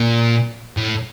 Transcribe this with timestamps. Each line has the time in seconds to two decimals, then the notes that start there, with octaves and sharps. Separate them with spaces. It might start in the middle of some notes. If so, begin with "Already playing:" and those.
Already playing: A#2
0.77 A2